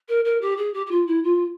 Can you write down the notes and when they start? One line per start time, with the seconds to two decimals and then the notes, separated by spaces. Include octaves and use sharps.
0.09 A#4
0.25 A#4
0.41 G4
0.57 G#4
0.74 G4
0.86 G4
0.91 F4
1.07 E4
1.23 F4